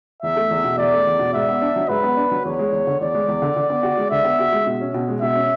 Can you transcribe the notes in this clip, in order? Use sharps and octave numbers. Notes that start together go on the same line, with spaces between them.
E2 E5
A3
E2
B2
E2 D5
A3
E2
B2
G#2 E5
B3
D4
F#3
G#2 B4
B3
D4
F#3
E2 C#5
G#3
E2
D3
E2 D5
G#3
E2
D3
D3
B3
F#4
G#3
D3 E5
B3
F#4
G#3
B2
C#4
B2
G#3
B2 E5
C#4